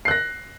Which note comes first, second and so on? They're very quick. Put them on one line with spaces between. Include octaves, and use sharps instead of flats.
C7 F#6 A#6